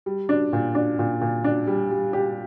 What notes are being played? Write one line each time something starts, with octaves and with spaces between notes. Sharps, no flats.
G3
D4
A#2
D4
A#2
A#2
D4
G3
G3
G4